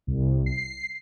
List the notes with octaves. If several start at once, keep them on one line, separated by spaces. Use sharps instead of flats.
C2
C7